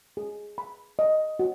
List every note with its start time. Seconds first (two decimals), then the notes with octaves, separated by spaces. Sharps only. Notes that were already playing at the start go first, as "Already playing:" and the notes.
0.17 G#4
0.58 B5
0.99 D#5
1.39 F#4